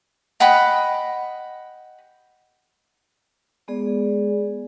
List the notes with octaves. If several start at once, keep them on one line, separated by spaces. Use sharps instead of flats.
D#5 F#5 G5 B5
G#3 B3 G#4 D5